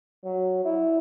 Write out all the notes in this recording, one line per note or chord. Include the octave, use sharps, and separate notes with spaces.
F#3
E4